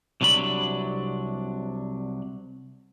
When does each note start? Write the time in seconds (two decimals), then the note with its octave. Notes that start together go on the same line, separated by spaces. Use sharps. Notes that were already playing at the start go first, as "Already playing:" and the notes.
0.21 C2 C3 F#3 D4 B5